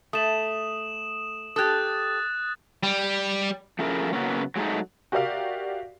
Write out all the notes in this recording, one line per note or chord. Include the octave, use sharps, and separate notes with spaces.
A3 D#6 E7 F#7
G4 A4 D#6 F#6 A6
G3
F3 A3 C#4 E4 G#4 A#4
C#3 F#3 A#3 B3 C#4
F#3 G#3 A3 C4 D#4
F#4 G4 A#4 D5 E5 F5